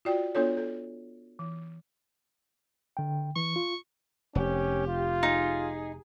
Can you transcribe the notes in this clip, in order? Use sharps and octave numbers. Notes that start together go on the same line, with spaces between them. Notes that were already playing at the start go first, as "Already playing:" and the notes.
F4 F#4 D5 G5
B3 D4 F4 A4 C#5
A4
E3
D3 G5
E3 C#6
F4
F1 C#4 G4
F4
D#4 G#4